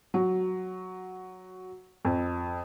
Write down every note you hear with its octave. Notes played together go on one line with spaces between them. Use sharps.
F#3
F2